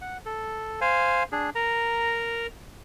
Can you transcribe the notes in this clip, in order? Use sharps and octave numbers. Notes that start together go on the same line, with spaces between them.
F#5
A4
C5 F5 G#5
D4 G#4
A#4 A#5